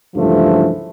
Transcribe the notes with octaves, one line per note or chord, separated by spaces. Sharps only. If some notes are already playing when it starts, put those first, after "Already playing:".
C#2 G2 D3 E3 F3 A3